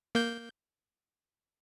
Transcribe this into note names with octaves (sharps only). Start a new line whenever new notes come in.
A#3 G6